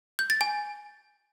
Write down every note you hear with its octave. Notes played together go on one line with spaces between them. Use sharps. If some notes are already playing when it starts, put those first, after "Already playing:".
G6
A6
G#5